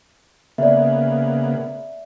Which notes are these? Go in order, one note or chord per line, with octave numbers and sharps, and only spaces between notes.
C#3 A#3 B3 D5 E5